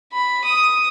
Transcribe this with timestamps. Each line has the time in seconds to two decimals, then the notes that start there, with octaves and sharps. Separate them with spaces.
0.13 B5
0.45 D#6